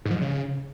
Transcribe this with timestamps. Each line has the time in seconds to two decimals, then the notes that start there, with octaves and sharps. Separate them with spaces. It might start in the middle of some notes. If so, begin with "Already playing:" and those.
0.05 G#2
0.11 F3
0.16 G#2
0.21 C#3